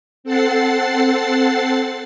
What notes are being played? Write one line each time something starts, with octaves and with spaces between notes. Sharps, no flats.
C4 A4 F#5 A6 C7